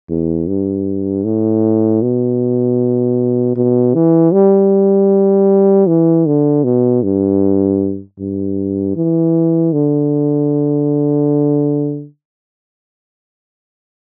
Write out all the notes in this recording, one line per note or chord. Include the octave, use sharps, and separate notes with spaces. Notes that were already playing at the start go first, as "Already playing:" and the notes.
E2
G2
A2
B2
B2
E3
G3
E3
D3
B2
G2
G2
E3
D3